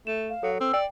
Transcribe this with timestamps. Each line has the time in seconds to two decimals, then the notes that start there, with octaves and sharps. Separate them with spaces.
0.07 A3 E7
0.30 F5
0.43 F#3 A4
0.60 C4 E6
0.73 D5 G5